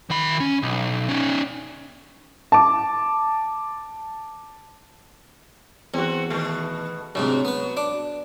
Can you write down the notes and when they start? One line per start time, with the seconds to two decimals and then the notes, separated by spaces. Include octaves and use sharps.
0.10 D#3 B5
0.40 C#4
0.62 B1
1.09 C#4 D#4
2.52 A5 D6
5.94 E2 C4 F#4
6.30 B2 D#3 A3
7.15 D2 G#2 C3 F#3
7.45 B3 B4
7.77 D4 D6